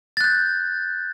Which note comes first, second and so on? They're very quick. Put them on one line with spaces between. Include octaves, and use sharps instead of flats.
A6 F#6 G6